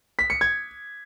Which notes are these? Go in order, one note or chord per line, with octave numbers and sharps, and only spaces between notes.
B6
C#7
G#6